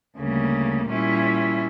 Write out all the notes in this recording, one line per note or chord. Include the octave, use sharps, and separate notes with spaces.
D2 C#3 G3 A#3
A#2 G3 C#4 E4